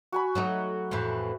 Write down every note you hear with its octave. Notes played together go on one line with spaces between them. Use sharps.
F#4 G#5 B5
F#3 A3 D#4
F2 A2 E3